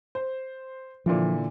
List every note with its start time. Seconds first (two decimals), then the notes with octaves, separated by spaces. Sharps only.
0.15 C5
1.06 A#2 D3 E3 F3